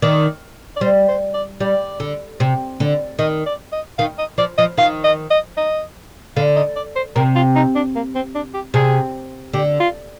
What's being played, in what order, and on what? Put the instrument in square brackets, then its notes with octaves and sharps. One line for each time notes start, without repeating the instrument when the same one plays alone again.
[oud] D#3 [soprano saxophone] D5
[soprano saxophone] D5
[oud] G3 [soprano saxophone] C5
[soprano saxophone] C5
D5
[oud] G3 [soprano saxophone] D5
[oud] D3
C3
D3
[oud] D#3 [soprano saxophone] D#5
[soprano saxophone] D5
D#5
[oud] D#3 [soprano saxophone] F5
[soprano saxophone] D#5
[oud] F3 [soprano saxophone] D5
[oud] F3 [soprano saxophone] D#5
[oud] D#3 [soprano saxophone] F5
[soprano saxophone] D#5
D#5
D#5
[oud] D3 [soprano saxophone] F5
[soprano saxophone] D#5
D5
C5
[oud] C3 [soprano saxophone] A#4
[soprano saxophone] F4
D#4
D4
A#3
C4
D4
G4
[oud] C3 [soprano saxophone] G#4
[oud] D3 [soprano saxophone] G4
[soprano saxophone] F4